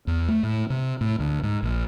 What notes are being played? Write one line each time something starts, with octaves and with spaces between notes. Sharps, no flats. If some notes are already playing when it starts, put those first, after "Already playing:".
E2
A3
A2
C3
A2
D2
G#2
A#1